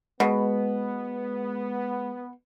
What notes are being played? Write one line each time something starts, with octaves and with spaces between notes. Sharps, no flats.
B2 G#3 B3